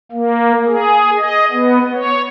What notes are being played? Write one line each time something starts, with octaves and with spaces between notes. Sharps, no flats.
A#3
G#4
D#5
B3
C#5